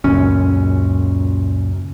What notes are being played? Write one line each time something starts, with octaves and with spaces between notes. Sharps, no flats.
C#2 F#2 A#2 C#4